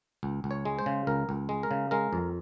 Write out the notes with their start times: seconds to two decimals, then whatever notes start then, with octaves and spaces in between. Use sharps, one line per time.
0.23 C#2
0.44 C#2
0.51 C#5
0.65 G#3
0.79 C5
0.86 C#3
1.07 C#2 A#4
1.29 C#2
1.49 G#3
1.63 A#4
1.71 C#3
1.91 G#3 A#4
2.13 F2